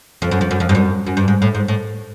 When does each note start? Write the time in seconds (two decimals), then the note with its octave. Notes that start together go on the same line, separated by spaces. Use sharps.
0.22 F2
0.31 F#2
0.41 F2
0.51 F#2
0.60 F2
0.69 G2
0.75 F#2
1.07 F#2
1.17 G2
1.28 G#2
1.42 A2
1.55 G#2
1.68 A2